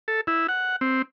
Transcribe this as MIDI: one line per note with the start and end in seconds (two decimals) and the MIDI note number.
0.08 0.21 69
0.27 0.47 64
0.49 0.76 78
0.81 1.02 60